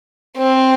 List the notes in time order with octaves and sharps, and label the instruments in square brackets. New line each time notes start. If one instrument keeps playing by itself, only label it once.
[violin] C4